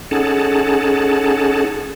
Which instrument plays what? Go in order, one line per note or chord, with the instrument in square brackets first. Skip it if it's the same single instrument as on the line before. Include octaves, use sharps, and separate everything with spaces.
[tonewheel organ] C#4 D#4 G#4 A4 F#5 A5